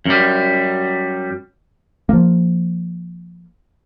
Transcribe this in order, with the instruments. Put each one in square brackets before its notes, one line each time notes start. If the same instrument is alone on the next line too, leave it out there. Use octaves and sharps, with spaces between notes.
[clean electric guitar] F#2 G3
[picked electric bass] F3 A#3